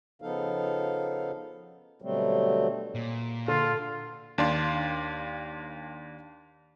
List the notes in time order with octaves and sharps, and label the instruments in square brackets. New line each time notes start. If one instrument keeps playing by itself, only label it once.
[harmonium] C#3 F3 B3 D#4 A4 F5
B2 D3 F#3 G3 A3 C4
[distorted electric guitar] A#2
[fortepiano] D3 [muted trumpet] F4
[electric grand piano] D#2 D4 D5 F5 C6